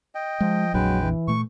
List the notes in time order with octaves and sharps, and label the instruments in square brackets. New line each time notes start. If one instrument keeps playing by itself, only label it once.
[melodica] D#5 G5
[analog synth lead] F3 [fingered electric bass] G#3
[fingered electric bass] A#1 F2 D4 [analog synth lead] F#3 [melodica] G#3 B4 G5
[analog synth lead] E3
[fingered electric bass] A#2 A3 [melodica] C#6